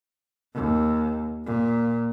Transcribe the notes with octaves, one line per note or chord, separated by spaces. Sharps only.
D#2
A#2